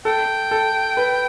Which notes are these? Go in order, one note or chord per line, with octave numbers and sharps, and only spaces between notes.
A4 G5
A4
B4